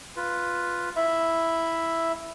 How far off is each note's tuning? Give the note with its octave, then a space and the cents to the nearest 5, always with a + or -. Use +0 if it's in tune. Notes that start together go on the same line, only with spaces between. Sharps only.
F4 +0 B4 +0
E4 +0 E5 +0 B5 +0